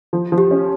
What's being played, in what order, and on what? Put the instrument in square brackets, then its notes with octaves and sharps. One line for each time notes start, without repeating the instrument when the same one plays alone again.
[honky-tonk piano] F3
F3
[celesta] G4
[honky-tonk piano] C#4